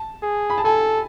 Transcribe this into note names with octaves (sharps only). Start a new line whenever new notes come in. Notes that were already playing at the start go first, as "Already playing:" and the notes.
Already playing: A5
G#4
B5
A5
A4 G#5